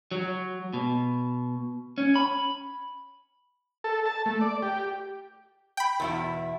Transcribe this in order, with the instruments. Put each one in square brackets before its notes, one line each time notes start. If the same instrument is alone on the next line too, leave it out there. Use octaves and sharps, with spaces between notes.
[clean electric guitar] F#3
B2
C#4
B5
[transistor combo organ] A4
A5
A3
D5
G4
[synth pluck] G5 B5
[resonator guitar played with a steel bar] E2 B2 E4